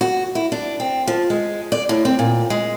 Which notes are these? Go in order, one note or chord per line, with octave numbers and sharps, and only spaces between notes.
F#4
E4
D4
C4
F3
G#3
D5
A2
C4
A#2
G#3